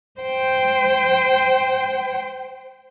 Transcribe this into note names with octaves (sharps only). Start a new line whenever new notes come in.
C5 G5